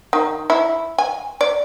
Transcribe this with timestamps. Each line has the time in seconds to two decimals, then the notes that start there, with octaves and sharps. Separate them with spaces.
0.13 D#3
0.50 E4
0.98 G#5
1.41 D5